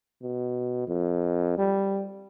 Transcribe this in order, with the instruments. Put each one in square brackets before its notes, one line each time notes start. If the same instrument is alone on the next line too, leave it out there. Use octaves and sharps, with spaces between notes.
[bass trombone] B2
F2
G3